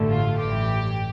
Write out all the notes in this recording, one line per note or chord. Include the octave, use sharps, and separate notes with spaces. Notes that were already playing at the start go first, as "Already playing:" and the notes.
Already playing: A1 G2 D3 A3
F4
A1 G2 E3 G4